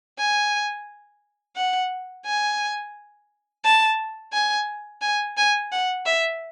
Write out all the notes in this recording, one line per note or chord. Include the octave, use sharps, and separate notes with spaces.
G#5
F#5
G#5
A5
G#5
G#5
G#5
F#5
E5